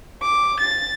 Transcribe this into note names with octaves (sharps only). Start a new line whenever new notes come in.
D6
A6